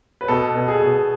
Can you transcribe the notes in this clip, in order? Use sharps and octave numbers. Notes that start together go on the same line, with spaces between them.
B4
B2 A4
B2
G#4
B2